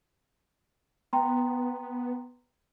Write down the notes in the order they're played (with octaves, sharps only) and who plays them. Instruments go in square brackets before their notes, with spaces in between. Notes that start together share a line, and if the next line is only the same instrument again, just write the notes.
[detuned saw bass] B3 [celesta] G5 A#5 C6